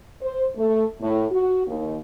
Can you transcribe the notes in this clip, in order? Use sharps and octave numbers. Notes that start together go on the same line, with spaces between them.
C5
A3
A2
F#4
D#2